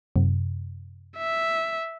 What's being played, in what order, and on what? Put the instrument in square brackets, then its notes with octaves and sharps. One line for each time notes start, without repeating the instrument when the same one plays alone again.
[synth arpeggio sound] F#2 C3
[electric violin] E5